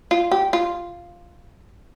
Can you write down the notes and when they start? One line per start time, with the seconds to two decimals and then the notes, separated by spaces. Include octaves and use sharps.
0.11 F4
0.31 G4
0.53 F4